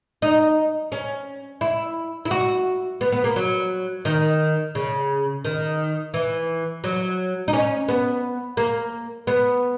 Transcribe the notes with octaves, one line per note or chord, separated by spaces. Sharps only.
D#4
C#4
E4
E4
F#4
B3
B3
A#3
F#3
D#3
C#3
D#3
E3
F#3
D#4
C#4
B3
A#3
B3